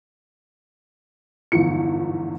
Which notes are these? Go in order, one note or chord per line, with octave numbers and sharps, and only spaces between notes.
G1 E2 G#2 F3 E4 C#7